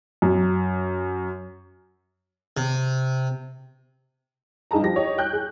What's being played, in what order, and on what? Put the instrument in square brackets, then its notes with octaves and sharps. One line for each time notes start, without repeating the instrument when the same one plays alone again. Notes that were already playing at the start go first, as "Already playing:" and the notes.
[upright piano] F#2
[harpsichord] C3
[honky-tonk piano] G2 D#4 G#4 A5 A#5
F3 G4 A#6
G4 C#5 D#5
G5 F#6 G6
G#4